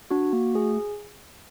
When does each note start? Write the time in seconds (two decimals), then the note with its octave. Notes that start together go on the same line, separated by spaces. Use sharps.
0.11 D4 F#4
0.33 A#3 F#4
0.55 A3 G#4